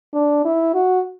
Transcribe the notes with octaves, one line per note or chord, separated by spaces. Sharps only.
D4
E4
F#4